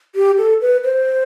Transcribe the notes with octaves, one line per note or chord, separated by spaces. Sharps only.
G4
A4
B4
C5